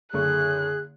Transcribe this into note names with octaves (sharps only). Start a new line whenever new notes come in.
F#1 D3 G#4 C#6 F#6